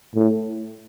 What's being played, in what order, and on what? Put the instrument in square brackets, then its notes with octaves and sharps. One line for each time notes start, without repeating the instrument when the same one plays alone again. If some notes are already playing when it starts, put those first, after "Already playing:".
[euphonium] A2